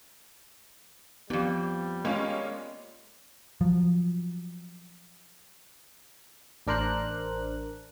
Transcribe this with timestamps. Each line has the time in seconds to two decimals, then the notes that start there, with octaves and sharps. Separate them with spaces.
1.30 F2 G#2 G3 B3 G4
2.05 G#3 A#3 C#4 F4
3.61 F3 F#3
6.67 A1 D4 A#4 C5 F#6